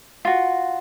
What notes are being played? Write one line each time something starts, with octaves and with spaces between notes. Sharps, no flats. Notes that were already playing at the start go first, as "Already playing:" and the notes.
F4 F#4